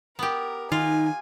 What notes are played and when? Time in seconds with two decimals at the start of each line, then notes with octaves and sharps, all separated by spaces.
0.19 B3 G4 A#4
0.72 D#3 D#4 F4 G#5